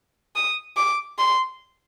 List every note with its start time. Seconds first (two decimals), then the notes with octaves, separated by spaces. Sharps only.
0.36 D#6
0.77 D6
1.19 C6